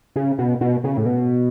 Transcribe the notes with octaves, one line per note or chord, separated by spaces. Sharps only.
C#3
B2
B2
C#3
A2
B2